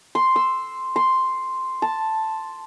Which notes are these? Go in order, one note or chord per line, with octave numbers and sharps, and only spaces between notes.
C6
E6
C6
A5